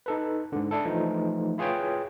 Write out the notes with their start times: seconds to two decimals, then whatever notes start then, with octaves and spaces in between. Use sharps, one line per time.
0.06 D#4 A4 B4
0.52 G#2 D3
0.71 D4 E4 A4
0.85 E3 F3 A3 D#4
1.58 E4 F4 G#4 B4 C#5 G5